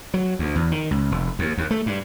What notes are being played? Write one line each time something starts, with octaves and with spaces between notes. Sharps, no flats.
F#3
D2
E2
D#3
C#2
F1
D#2
D#2
A3
G2